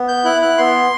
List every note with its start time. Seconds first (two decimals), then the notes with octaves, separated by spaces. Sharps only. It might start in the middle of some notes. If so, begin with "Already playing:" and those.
Already playing: B3
0.08 G6
0.24 E4 F#6
0.42 F#6
0.58 B3 C6